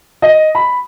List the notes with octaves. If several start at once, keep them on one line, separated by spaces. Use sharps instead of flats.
D#5
B5